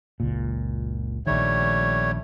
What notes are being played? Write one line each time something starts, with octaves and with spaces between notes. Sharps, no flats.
F#1 C#2 A#2
A#1 D#3 G3 A3 C#5